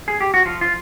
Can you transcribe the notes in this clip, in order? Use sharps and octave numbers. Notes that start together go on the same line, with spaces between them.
G#4
G4
F#4
F3 F4
F4